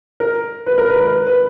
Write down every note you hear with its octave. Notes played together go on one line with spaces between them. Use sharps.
A#4
B4
A#4
B4
A#4
B4
B4